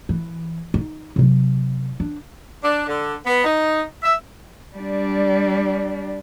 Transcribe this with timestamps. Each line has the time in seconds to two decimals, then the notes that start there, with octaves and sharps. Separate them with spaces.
0.09 E3
0.74 D#4
1.16 C3 F#3
2.00 D4
2.63 D4
2.87 D3
3.25 B3
3.44 D#4
4.03 E5
4.76 G3 D4